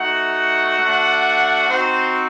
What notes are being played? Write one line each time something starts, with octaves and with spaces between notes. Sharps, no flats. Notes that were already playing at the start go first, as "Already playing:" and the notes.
Already playing: A3 D#4 F#4 F#5
A3 D4 F#4
C4 D#4 F#4 C5